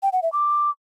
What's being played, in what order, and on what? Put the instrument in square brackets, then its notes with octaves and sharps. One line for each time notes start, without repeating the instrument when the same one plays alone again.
[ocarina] G5
F#5
E5
D6